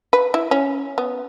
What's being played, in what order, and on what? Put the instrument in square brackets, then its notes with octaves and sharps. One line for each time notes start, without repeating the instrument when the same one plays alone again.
[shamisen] B4
E4
C#4
B3